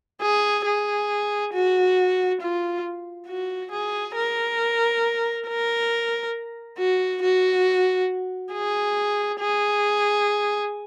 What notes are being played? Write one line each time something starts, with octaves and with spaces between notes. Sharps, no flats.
G#4
G#4
F#4
F4
F#4
G#4
A#4
A#4
F#4
F#4
G#4
G#4